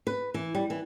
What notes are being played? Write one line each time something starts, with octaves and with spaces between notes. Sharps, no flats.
B4
E3
G3
E3